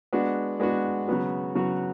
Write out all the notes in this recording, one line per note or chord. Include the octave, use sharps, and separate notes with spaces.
G#3 B3 D4 F#4
G#3 B3 D4 F#4
C#3 F#3 B3 F#4
C#3 F#3 B3 F#4